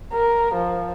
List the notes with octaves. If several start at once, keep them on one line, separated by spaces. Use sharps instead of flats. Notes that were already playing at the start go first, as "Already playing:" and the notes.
A#4
F3